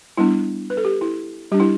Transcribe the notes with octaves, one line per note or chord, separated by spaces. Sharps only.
G3 B3 D4 E4
B4
A4
G4
E4
G3 D4 G4
E4